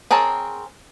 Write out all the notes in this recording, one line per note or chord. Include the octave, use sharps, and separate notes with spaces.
C4 G#4 A#4 C#5 A5